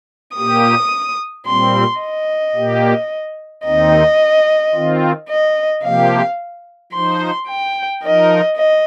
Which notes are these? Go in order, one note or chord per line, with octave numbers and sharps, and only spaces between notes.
A#2 A#3 G4 D#6
A#2 G3 C4 C6
D#5
A#2 A#3 G4
D#2 D#3 C4 D#4 D#5
D#3 C4 F4
D#5
C3 F3 A#3 G4 F5
F3 D#4 C5 C6
G5
F3 D#4 A#4 D#5
D#5